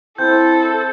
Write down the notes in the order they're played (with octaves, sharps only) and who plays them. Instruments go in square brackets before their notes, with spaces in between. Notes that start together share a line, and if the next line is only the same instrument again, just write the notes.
[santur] C4 [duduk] E4 [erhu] A4 [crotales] G6